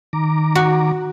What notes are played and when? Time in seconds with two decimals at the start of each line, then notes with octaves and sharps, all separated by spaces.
0.13 D#3 A#5 D6
0.55 F#4